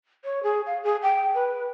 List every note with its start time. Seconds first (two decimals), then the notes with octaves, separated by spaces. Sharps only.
0.24 C#5
0.43 G#4
0.67 F5
0.83 G#4
1.02 G5
1.34 B4